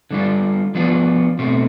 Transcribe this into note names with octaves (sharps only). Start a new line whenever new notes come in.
D3 G3 D4 F4
F3 B3 D4 F4
B2 A3 C4